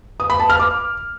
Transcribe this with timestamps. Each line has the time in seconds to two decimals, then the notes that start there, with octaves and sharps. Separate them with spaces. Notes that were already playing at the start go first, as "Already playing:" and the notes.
0.20 D#6
0.30 B5
0.40 A5
0.50 F6
0.60 D6